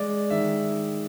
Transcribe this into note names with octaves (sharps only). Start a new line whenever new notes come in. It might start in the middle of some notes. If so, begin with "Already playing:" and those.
Already playing: G#3 D5
D#3 E5